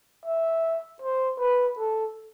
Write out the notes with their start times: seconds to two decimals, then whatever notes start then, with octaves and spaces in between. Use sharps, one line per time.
0.25 E5
1.02 C5
1.40 B4
1.78 A4